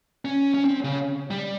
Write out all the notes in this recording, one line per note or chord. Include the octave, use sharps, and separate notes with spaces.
C#4
C#4
C4
C#3
G3